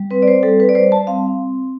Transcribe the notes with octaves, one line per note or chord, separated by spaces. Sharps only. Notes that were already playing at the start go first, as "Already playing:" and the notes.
Already playing: G3
C4 B4
D5
C5
G3 A4
B4
D5
G3 C5
A5
C4 F5